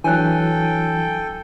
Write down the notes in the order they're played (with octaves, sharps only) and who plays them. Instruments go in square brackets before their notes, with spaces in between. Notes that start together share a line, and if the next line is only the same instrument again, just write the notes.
[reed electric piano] E3 F#3 [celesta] D4 C#5 F#6 [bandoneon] A4 G5 [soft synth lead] G#5